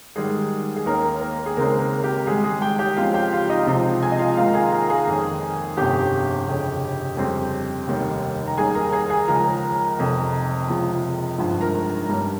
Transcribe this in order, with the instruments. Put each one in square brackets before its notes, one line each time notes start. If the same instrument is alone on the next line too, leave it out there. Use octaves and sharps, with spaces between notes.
[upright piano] G#2 D#3 G3 G#3 G#4
G#4
D#2 D#3 A#3 C#4 A#4
A#3 A#4
G#4
C#2 C#3 G#3 A#3 C4 A#4
A#3 A#4
G4
G#2 D#3 G3 G#3 G#4
G#3 G#4
G4 G5
G4 G5
C#2 C#3 F3 C4 F4 F5
G4 G5
F4 F5
D#4 D#5
C#2 C3 F3 C4
G#4 G#5
D#5
F4 F5
G#1 G#2 D#3 A#3 D#4 F4 F5
A#5
G#4 G#5
A#4 A#5
G#4 G#5
F2 D#3 A#3 C#4
G1 F2 C3 G4 G5
F1 F2 C#3
F2 C#3 G3 C4
F1 D#2 D#3 G3 C#4
A#5
D#2 D#3 G3 C#4 G#4 G#5
A#4 A#5
G#4 G#5
G#4 G#5
C#2 C#3 F3 A#4 A#5
F1 F2 C3
C#2 C3 F3 G#3
G#1 G2 F3 G#3
A#4 A#5
G2 G3 C#4